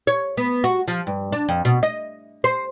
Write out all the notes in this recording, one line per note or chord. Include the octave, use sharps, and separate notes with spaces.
C#5
B3
F#4
F3
G2
D4
F2
B2
D#5
C5